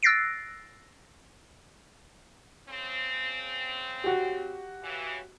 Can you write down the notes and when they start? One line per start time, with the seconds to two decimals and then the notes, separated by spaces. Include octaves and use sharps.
0.03 E6 F#6 A6 A#6 C7 D7
2.68 C#3 C4
4.04 F#4 G4
4.83 C#3 E3